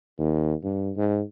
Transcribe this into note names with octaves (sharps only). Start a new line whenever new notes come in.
D#2
G2
G#2